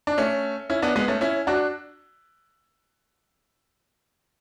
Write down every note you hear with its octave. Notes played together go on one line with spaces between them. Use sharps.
D4
A3 C#4
C#4 E4
B3 D4
G#3 B3
A3 C#4
C#4 E4
D4 F#4